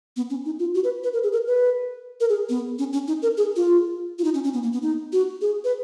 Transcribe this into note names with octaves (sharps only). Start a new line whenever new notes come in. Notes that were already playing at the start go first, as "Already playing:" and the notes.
B3
C#4
D#4
F4
F#4
B4
B4
A#4
G#4
A#4
B4
A#4
G#4
B3
C#4
C#4
D#4
A#4
G#4
F4
F4
D#4
C#4
C#4
B3
A#3
B3
D#4
F#4
G#4
B4